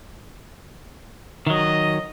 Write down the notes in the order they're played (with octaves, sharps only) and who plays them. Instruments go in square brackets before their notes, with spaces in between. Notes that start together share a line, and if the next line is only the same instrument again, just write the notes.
[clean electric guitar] D#3 F#3 [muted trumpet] D#5